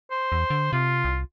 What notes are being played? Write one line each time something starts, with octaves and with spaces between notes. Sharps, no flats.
C5
E2
D3
C3 F4
C2